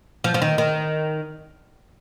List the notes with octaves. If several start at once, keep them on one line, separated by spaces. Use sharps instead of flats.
F3
F3
D#3
D#3